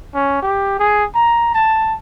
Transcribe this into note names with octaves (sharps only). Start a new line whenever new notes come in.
C#4
G4
G#4
A#5
A5